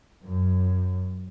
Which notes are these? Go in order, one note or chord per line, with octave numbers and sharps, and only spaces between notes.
F#2